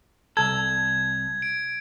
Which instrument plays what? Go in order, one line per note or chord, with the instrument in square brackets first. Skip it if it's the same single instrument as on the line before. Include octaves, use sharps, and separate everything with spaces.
[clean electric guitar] C2 A4 [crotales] G#6
[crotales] D7